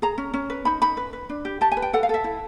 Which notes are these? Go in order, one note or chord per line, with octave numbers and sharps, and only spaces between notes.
G#4 A#5
C#4
C#4
B4
D#4 B5
D#4 B5
B4
B4
D4
G4
G4 A5
G#5
B4
G5
A4 F#5
F5
A4 E5
E4